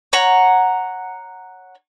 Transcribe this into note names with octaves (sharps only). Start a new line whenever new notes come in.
C#5 F#5 A#5